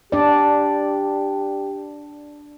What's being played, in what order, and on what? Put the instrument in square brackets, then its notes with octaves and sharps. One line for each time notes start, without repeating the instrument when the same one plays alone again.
[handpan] D4 D5 [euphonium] G4